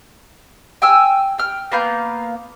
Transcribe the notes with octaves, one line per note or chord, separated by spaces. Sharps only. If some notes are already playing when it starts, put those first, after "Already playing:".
G5 G#5 E6 F6
G5 F6
A#3 B3 F5 G6